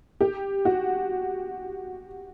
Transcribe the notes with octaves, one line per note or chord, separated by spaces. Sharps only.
G4
F#4